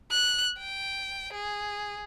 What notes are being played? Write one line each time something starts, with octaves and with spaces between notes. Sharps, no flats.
F#6
G5
G#4